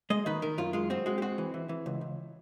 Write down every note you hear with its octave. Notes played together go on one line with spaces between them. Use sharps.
G#3 D#5
D#3 B4
D#3 A#4
F#2 F4
G#3 F4
C4 F#4
G#3 F#4
G4
C4 F#4
E3
E3
E3
C#2
C#2